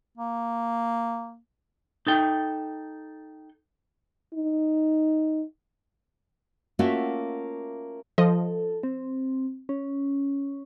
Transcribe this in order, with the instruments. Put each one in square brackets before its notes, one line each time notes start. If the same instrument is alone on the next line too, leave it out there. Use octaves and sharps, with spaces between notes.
[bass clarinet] A#3
[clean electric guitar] D#4 A4 G5
[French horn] D#4
[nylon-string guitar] A3 A#3 C#4 F4 F#4 E5
[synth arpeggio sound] F3 D#5 [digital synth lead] A4
[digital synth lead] C4
C#4